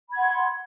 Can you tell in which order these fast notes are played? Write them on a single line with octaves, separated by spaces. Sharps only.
B5 G#6 F#5 C6